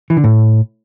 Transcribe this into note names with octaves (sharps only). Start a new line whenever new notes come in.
E3
D3
A2